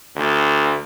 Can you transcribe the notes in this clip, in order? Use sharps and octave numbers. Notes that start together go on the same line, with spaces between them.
D2